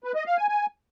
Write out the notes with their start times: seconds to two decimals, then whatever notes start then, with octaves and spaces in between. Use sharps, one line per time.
0.04 B4
0.15 D#5
0.26 F5
0.37 G#5
0.48 G#5